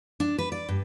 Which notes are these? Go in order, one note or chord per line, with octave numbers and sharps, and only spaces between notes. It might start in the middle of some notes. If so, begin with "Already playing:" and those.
D4
B4
D5
G2